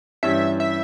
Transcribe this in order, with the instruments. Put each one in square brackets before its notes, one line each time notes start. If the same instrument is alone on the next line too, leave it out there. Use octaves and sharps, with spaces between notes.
[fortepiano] G2 E3 G3 C#4 [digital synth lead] E5
[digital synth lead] E5